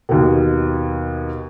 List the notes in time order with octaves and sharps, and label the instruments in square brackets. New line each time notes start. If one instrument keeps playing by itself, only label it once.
[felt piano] D#2 B2